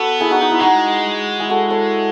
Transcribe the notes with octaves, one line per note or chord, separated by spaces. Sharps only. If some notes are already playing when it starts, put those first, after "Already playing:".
Already playing: B3 F#4 A4 B4
E4 G#4
D#4 F#4
D#4 F#4
E4
G#3 D#4 F#4
E4 G#4
F#4 A4
A4 C#5